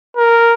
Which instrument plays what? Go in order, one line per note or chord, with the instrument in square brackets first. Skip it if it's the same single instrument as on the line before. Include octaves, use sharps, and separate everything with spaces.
[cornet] A#4